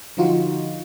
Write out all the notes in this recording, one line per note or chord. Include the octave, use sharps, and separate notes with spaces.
D3 F3 D#4 F4 F#4